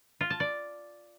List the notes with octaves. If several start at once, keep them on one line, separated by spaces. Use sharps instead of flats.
F4
A5
D5